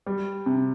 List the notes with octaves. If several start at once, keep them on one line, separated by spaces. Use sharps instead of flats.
G3
C3